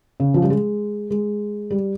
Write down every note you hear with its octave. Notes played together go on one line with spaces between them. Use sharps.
C#3
F3
G3
G#3
G#3
G3